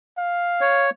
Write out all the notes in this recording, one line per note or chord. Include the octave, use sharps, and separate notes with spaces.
F5
C#5